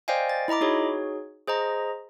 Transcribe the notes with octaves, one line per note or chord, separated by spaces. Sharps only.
C5 D5 D#5 F5 G5 G#5
A6
E4 D#5 A#5 B5 D6
D#4 F#4 G#4 C#5
G#4 C5 D#5 A#5